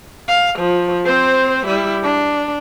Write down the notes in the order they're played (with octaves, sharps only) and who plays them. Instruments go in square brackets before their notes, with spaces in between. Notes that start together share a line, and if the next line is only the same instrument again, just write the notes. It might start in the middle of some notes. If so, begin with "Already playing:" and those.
[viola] F5
F3
C4 C5
G3 E4
D4